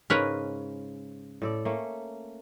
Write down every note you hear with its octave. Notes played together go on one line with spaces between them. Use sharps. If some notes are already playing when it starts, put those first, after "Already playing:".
G#2 C#3 A#4 B4 C#5
A2 A4 D5
A3 A#3 C#4